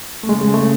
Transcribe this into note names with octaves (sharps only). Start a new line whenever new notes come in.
A3
C#3 G#3
G#3
A3